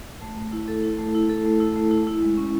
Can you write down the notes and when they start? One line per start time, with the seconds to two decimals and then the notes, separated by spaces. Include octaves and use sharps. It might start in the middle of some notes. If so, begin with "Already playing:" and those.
0.22 A3
0.38 A3
0.52 E4
0.68 A4
0.83 E4
0.99 A3
1.15 E4
1.30 A4
1.45 A3
1.60 E4
1.76 A3
1.91 E4
2.07 E4
2.22 G#3
2.37 C#4